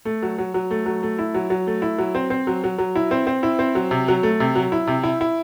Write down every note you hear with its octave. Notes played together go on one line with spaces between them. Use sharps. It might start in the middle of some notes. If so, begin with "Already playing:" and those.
A3
F#3
F#3
F#3
A3
F#3
A3
E4
F#3
F#3
A3
E4
F#3
C4
C4
F#3
F#3
F#3
E4
C4
C4
E4
C4
F#3
C3
F#3
A3
C3
F#3
E4
C3
E4
E4